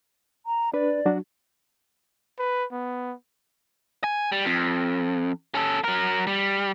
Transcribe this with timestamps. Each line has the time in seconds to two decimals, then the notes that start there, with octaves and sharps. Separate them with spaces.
0.46 A#5
0.74 D4 B4 D5
1.06 F#3 D4 F#4
2.39 B4
2.72 B3
4.04 G#5
4.32 G3
4.45 F2
5.55 C#4 A4
5.84 F#3 A#4
6.27 G3